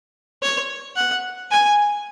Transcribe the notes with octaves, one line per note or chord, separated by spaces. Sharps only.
C#5
F#5
G#5